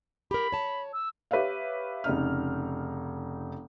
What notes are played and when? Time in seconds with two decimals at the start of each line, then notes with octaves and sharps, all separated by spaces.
0.31 G4 A#4 B5
0.52 C#5 A5
0.93 E6
1.31 G4 B4 C#5 E5 F5
2.04 F1 C#3 D#4 F6